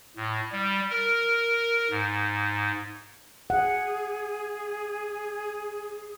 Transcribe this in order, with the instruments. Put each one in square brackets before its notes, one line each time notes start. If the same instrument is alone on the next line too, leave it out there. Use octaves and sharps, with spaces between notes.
[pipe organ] A2
G3
A#4
G#2
[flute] G#4 [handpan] F#5